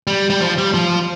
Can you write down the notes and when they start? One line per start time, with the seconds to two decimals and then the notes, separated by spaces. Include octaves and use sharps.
0.07 G3
0.30 G3
0.41 F3
0.58 G3
0.74 F3